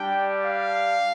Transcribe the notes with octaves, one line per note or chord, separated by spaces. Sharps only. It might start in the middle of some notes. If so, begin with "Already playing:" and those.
Already playing: G3 D4 G4 G5
F5